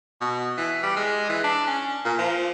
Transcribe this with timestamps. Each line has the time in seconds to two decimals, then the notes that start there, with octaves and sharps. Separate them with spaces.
0.21 B2
0.57 E3
0.83 G3
0.97 G#3
1.29 E3
1.44 D4
1.67 C#4
2.05 A#2
2.18 F3